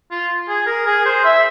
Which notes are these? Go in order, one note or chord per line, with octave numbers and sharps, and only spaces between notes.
F4
G#4
A#4
G#4
C5
E5